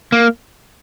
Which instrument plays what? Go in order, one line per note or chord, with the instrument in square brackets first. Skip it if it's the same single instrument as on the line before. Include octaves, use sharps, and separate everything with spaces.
[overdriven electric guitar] A#3